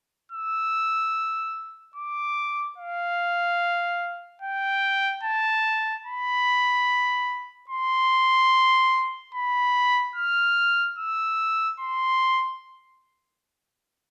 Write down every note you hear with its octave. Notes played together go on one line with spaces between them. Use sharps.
E6
D6
F5
G5
A5
B5
C6
B5
F6
E6
C6